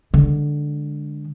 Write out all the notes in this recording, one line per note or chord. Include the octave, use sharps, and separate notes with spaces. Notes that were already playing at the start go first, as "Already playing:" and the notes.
D3 G#3